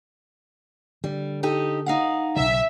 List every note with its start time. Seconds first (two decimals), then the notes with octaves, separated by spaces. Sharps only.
1.04 D3 G3
1.43 D#4 G4 A4
1.86 D#4 F5 F#5
2.36 B1 C#3 E5